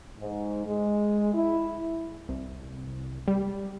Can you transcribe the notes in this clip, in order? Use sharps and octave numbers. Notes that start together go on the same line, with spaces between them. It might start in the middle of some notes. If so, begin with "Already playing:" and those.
G#2
G#3
E4
C2
G3